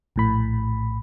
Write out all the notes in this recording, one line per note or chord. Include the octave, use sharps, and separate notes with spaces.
A#1 A2 B5